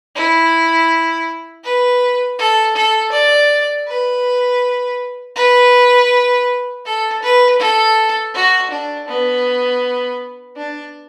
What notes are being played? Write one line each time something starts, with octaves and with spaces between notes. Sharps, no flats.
E4
B4
A4
A4
D5
B4
B4
A4
B4
A4
F#4
D4
B3
D4